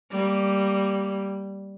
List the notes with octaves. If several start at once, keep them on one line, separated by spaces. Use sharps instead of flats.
G3 A#3